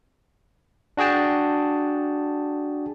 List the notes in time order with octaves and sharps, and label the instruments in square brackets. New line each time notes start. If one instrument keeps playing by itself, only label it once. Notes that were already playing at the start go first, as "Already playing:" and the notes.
[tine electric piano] D4 F#4 G#4 G5 A5